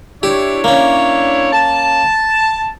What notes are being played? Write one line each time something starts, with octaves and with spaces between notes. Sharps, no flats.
D4 E4 G4 C#5
A#3 C#4
A5